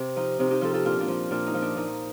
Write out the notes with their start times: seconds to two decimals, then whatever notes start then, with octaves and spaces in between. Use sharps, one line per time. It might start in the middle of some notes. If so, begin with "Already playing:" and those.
Already playing: C3
0.16 F3 D#4
0.39 C3 D#4
0.50 D#4 G4
0.61 F3 F4 A4
0.73 F4 A4
0.85 A#2 D4 F4
1.00 D4 F4
1.08 F3
1.31 A#2 D4 F4
1.47 D#4
1.54 F3
1.62 D4
1.77 A#2 D#4